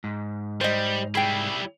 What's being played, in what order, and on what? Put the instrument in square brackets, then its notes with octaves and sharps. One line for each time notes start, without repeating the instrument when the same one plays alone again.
[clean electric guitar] G#2
[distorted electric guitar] G3 [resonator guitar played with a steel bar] C5 D#5
[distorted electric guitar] G3 E4 [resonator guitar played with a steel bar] G#4 G5